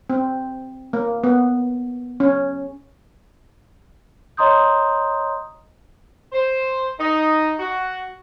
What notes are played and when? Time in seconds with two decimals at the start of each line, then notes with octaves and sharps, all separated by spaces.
0.10 C4
0.93 A#3
1.24 B3
2.20 C#4
4.37 C#5 D#5 A#5 C6 D#6 G6
6.32 C5
6.98 D#4
7.59 F#4